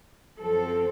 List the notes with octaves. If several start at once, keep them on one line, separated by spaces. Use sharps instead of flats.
F#2 F3 C4 A4